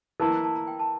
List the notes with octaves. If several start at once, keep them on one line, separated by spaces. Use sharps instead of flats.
E3 A#3 E4 A5
A#5
A5
A#5
G5
A5